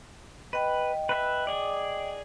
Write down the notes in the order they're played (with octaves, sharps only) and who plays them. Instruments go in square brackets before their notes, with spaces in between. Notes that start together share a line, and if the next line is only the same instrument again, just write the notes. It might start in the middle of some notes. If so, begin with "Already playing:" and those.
[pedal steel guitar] B4 [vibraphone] D#5 G5
[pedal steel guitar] B4 E5
G#4 D5